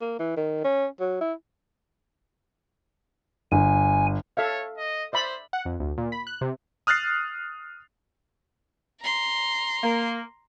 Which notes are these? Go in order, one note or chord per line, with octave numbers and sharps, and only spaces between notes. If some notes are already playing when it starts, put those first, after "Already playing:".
A#3
E3
D#3
C#4
F#3
E4
G1 G#5
A4 C#5 E5 F5
D#5
C5 D5 E5 B5
F#5
F2
D2
A#2
B5
F#6
C3
D#6 F6 F#6 A6 C7
A#5 C6
A#3